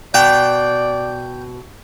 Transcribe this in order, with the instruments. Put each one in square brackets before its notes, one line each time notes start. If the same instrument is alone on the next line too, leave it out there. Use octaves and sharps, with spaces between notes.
[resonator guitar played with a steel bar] B2 [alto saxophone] D5 [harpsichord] G5